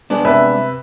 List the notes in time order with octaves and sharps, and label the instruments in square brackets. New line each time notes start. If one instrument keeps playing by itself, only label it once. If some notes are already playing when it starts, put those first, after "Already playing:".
[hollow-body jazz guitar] G#3 B3 D4
[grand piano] C3 B4 E5